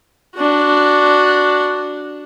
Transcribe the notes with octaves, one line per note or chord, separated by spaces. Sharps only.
D4 F#4